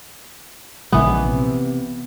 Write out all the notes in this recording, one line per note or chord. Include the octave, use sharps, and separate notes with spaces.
A#1 C#3 E3 G#3 B3
C3